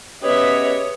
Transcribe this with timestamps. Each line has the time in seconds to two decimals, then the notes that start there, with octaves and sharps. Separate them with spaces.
0.23 B3 C#4 G4 G#4 B4 C#5 D#5 E5